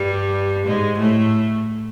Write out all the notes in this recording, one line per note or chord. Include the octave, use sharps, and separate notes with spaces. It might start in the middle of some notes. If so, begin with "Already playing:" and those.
Already playing: G2 G3
G#2 G#3
A2 A3